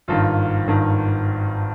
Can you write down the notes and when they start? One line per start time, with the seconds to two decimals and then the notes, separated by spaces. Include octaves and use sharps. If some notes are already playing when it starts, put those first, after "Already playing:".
0.08 G#1 G2 D#3 F4
0.67 G#1 G2 D#3